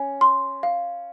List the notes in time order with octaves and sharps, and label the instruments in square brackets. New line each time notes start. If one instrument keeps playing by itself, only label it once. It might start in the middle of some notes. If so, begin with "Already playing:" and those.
Already playing: [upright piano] C#4 [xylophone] G#5
[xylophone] C6
F5